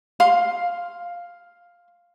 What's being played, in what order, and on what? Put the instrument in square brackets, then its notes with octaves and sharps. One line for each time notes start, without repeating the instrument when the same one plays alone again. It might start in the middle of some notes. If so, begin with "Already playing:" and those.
[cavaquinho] F5 C6